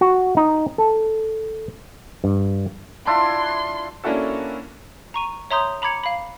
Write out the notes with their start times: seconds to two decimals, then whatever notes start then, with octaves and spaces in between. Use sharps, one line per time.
0.01 F#4
0.37 D#4
0.78 A4
2.24 G2
3.07 D4 E4 F4 C6
4.04 A#3 C#4 D4 E4 F#4 A4
5.14 A#5 C#6 D#7
5.51 C#5 E5 A#5 C6 D#6 G6
5.82 A#5 B5 D6 G#6 C#7
6.04 F5 B5